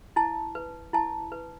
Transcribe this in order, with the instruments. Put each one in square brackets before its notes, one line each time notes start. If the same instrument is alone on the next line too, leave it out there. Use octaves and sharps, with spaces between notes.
[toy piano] E4 A5
B4
E4 A5
B4